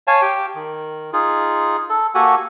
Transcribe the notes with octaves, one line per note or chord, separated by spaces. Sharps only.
C#5 F5 G#5 A5
G4 G5
D#3
D#4 F4 G#4
A4
A#3 F#4 G4 A4 F#5 G#5